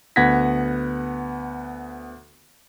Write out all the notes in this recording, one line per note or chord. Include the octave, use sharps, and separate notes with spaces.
D2 B3 F#5 G#6 A#6 B6